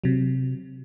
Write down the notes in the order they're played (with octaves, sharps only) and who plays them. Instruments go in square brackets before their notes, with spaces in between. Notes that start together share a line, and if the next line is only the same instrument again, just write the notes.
[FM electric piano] C3 F#3